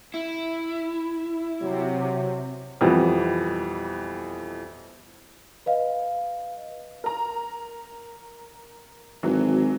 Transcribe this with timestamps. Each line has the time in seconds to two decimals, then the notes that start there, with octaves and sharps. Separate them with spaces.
0.14 E4
1.62 C3 F#3
2.81 F2 B2 E3 G3 B3
5.66 B4 D#5 F5
7.04 A#4 A#5
9.23 G#1 E3 F#3